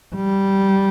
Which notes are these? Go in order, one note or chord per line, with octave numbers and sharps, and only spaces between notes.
G3